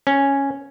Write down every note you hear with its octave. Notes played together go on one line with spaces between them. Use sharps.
C#4